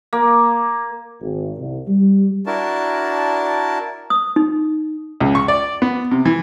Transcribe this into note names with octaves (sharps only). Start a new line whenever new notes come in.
A#3
G#1
C2
G3
D4 E4 F#4 A#4 A5
D#6
D#4
C#2
C#6
D5
B3
C3
E3